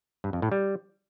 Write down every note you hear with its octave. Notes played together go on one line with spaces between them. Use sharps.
G2
F2
A2
G3